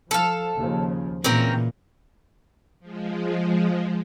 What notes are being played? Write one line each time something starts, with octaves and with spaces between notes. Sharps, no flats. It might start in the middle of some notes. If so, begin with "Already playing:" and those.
F3 A4 F5
D#2 C#3 F3
A#2 C#3 E3 C4 C#4 A#4
F3 G#3